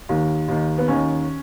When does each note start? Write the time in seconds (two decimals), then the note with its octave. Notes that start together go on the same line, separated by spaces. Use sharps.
0.09 D#2 D#3
0.48 D#2 D#3
0.78 B3
0.88 D#2 D#3 C#4